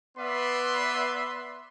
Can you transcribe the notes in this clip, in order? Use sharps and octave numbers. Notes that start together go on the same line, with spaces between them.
B3 B4 D5 E5 C6